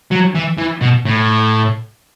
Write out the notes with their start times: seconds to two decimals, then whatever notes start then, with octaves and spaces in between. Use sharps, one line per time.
0.12 F#3
0.35 E3
0.58 E3
0.81 B2
1.05 A2